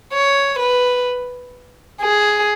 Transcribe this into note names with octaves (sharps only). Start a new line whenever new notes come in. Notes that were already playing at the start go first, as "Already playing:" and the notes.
C#5
B4
G#4